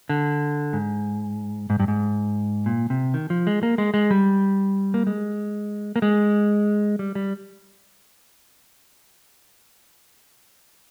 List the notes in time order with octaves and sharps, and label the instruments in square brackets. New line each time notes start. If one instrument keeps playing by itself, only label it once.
[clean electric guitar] D3
G#2
G#2
G2
G#2
A#2
C3
D#3
F3
G#3
A#3
G#3
G#3
G3
A#3
G#3
A#3
G#3
G3
G3